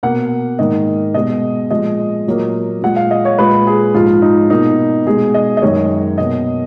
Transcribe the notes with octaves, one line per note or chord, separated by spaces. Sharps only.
B2 A#3 F#5
G#2 D#3 A#3 D#5
B2 G#3 D#5
A#2 F3 G#3 D#5
A#2 F#3 A#3
A#2 G#3 F#5
F5
D#5
C#5
A#2 G#3 B4
G#4
G#2 F3 G#3 F4
D#4
B2 A#3 D#4
B2 G#3 G#4
D#5
D#5
F#2 D#3 G#3 C#5
B2 A#3 D#5